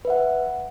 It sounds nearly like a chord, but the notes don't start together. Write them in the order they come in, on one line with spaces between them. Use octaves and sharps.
B4 E5 F#5